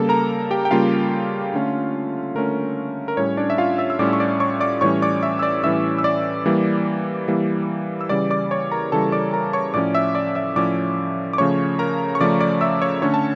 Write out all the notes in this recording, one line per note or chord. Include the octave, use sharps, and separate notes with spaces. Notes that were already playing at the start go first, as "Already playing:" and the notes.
Already playing: C#3 G3 A#3 A4 A5
A#4 A#5
G4 G5
G5
C#3 G3 A#3 F4 F5
D3 A3 C#4
D3 A3 C#4 A#4
A#4
A2 G3 C#4 C#5
D4 D5
E5
F4 F5
E5 E6
E6
A2 G3 C#4 D5 D6
C#6
D5 D6
C#5 C#6
D5 D6
A2 E3 G3 C#4 C#5 C#6
D5 D6
E5 E6
E6
D5 D6
A2 E3 G3 C#4 E5 E6
E6
D5 D6
E3 G3 A#3
E3 G3 A#3
E6
C#3 E3 G3 D5 D6
D5 D6
C#5 C#6
A#4 A#5
C#3 E3 G3 A4 A5
D5 D6
A#4 A#5
C#5 C#6
A2 F3 C#4 D5 D6
E5 E6
D5 D6
E5 E6
A2 F3 C#4 D5 D6
D6
C#3 F3 A3 C#4 C#5 C#6
A#4 A#5
C#6
C#3 F3 A3 C#4 D5 D6
D5 D6
E5 E6
C#5 C#6
D3 A3 C#4 C#5 C#6
A5